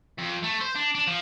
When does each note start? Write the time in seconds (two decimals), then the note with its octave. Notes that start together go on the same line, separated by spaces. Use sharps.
0.18 F2
0.43 A3
0.60 C5
0.75 D4
0.95 D4
1.07 F3